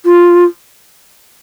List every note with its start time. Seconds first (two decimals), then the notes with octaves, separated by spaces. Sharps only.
0.05 F4